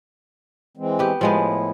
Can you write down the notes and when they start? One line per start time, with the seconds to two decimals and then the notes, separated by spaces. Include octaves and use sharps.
0.77 E3 G#3 C4
0.99 B3 G4
1.21 A2 F3 G#3 B3 E4